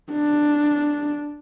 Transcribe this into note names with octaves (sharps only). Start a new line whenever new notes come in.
D4